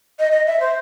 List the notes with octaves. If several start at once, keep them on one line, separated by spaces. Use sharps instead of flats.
D#5
D#5
E5
C5